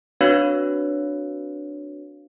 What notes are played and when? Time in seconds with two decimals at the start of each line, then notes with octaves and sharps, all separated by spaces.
0.21 C4 D4 F#4 B4 C#5 F5